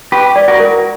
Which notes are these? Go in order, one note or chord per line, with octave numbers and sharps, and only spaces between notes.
G4 B4 C#6
D5
F#4 A#4
A#4